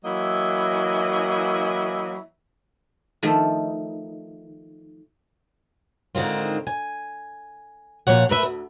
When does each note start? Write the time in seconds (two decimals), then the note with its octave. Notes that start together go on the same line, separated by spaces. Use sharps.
0.05 E3 F#3 A#3 E4 D#5 E5
3.23 D#3 F3 A3
6.15 G#2 D3 D#3 C4 F4
6.67 G#5
8.07 A#2 F3 C#5 F#5
8.29 A3 A#4 B4 E5
8.43 D2